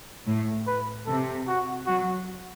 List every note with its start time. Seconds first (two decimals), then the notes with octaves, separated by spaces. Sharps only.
0.26 A2
0.67 B4
1.06 C3 A4
1.47 F#4
1.87 F#3 F#4